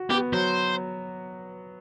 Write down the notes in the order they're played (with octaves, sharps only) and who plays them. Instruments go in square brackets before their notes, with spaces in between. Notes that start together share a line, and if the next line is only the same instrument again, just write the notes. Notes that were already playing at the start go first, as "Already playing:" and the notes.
Already playing: [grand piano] F#4
[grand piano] B3 [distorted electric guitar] G4
[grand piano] F#3 [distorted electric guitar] C5